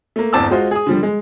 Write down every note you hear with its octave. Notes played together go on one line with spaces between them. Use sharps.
A3 A#3
G1 E2 C4 A5 D6 E6
G#3 F4 F#4 C5 D#5
G#4 D#6
D3 F3 G3
G#3